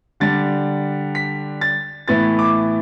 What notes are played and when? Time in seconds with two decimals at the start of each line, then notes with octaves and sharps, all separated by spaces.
0.20 D3 G3 D4 A6
1.15 B6
1.61 A6
2.08 A2 E3 B3 E4 A6
2.39 D6